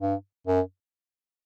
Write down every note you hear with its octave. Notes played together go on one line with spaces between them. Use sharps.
G2
F#2